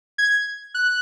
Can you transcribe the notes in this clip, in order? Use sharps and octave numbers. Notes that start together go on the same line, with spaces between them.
G#6
F#6